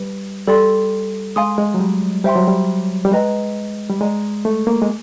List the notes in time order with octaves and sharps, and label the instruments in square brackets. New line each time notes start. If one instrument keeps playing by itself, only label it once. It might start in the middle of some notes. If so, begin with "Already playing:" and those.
Already playing: [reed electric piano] G3 [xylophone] B4
[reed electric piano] G3 [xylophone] A4 D5 G5 C6
[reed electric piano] G#3 [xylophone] F5 G#5 C6 D#6
[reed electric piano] G#3
F#3
G3
[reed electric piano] G3 [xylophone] C5 E5 G5 C6
[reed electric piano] F#3
G3
G3
[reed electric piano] G#3 [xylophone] G#4 B4 D#5 G5 A#5
[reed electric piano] G3
[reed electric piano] G#3 [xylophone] D5 F#5 A#5
[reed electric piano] A3
A#3
G#3